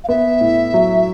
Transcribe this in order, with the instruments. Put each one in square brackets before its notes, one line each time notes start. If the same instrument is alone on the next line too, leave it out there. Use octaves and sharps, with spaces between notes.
[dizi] F5
[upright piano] B3 [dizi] E5
[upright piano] A2
F#3